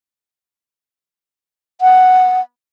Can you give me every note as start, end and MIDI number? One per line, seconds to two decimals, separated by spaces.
1.81 2.40 78